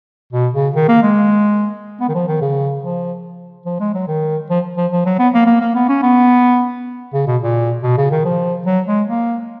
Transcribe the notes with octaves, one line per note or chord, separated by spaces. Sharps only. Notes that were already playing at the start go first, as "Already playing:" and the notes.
B2
C#3
D#3
A#3
G#3
B3
D#3
F3
D#3
C#3
F3
F3
G#3
F#3
D#3
F3
F3
F3
F#3
B3
A#3
A#3
A#3
B3
C#4
B3
C#3
B2
A#2
B2
C#3
D#3
F3
F#3
G#3
A#3